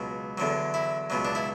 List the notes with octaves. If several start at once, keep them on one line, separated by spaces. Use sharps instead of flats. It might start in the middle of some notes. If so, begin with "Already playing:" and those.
Already playing: C#2 B2 F#3
E2 D3 F#3
E4
C#2 B2 F#3
D4
E4